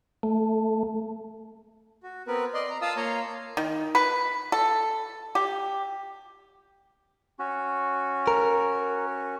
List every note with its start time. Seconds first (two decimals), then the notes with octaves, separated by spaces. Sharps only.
0.23 A3
2.03 F#4
2.27 B3 C4 A#4 B4
2.54 D5 D#5 C6
2.70 A#5
2.82 F4 F5 A5 D#6 E6
2.96 A#3 C#5 A#5 C6
3.57 D#3
3.95 B4
4.52 A4
5.35 G4
7.39 C#4 F#4
8.27 A#4